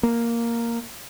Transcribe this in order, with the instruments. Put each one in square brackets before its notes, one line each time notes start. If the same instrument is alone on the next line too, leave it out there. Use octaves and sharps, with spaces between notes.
[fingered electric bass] A#3